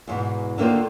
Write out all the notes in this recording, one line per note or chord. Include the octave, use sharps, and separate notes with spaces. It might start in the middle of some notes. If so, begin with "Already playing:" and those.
E2 G#2 B2
D3 D#3 A#3 F4 C5